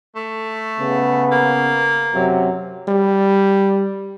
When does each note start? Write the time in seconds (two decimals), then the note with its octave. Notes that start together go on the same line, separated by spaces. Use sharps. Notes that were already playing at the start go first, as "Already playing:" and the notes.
0.16 A3
0.80 C#3 B3
1.32 A#3
2.14 F#2 C3 F#3
2.88 G3